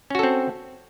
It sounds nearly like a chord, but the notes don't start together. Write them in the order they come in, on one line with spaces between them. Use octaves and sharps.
C#4 F#4 A4 C4